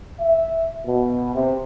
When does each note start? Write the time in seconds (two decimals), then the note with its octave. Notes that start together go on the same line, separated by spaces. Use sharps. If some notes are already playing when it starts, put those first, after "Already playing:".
0.21 E5
0.86 B2
1.35 C3